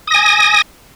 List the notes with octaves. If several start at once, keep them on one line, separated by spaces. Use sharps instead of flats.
G#5 D#6 A#6